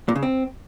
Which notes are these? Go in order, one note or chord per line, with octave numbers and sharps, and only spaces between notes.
A#2
C#3
C4